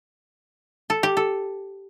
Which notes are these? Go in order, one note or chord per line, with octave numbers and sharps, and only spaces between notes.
A4
G4
A4